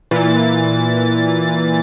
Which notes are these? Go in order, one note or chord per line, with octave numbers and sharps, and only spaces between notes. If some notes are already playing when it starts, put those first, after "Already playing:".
A#2 E3 A6